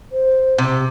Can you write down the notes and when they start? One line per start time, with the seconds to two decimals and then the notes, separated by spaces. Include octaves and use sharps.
0.12 C5
0.58 C3